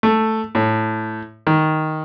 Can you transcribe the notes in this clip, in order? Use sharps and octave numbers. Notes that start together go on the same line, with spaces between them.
A3
A2
D#3